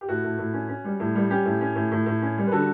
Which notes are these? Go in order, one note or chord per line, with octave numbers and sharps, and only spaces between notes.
G4
A2 F#4
A2
A2
C#4
C#4
G3
A2
G3
C#4 G4
A2
C#4
A2
A2
A2
C#4
G3
B4
D3 F#4 A4